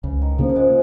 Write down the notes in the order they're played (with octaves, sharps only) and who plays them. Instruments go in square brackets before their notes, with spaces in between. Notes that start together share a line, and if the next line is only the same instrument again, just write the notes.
[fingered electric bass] C#2 [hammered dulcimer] C#3
[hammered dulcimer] D#3
[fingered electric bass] C#3 A#3 C#4 [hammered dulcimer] F3
[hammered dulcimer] F3
G#2 G#3